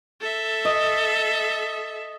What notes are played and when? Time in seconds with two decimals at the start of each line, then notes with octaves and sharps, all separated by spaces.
0.20 A4 E5
0.65 D#5